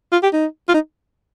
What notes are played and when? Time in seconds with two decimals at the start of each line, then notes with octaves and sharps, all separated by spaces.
0.12 F4
0.23 G4
0.33 D#4
0.69 F4
0.74 D#4